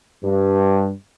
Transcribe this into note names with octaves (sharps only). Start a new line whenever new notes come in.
G2